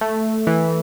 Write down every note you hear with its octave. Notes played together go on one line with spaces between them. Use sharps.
A3
E3